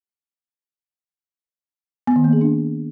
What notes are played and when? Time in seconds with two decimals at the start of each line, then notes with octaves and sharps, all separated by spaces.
2.07 B3
2.16 D#3
2.24 A#3
2.33 G#4
2.41 D4